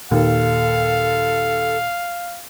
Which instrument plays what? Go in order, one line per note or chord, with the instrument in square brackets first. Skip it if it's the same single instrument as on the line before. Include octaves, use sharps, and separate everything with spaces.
[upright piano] D#2 [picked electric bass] A#2 [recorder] A4 [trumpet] F5